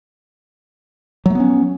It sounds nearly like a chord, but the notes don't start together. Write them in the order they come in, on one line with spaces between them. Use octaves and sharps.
F#3 A3 B3 C#4